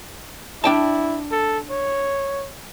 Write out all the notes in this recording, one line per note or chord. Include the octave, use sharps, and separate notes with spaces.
D4 E4 G5 A5
A4
C#5